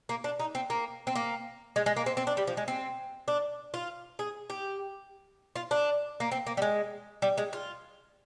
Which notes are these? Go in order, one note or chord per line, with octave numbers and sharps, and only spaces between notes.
A#3
D4
D#4
C4
A#3
C4
A#3
G#3
G#3
A#3
C4
C4
D4
G3
F3
G#3
C4
D4
F4
G#4
G4
F4
D4
A#3
C4
A#3
G3
G#3
G3
G#3
F4